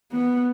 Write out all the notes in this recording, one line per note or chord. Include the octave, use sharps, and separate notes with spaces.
B3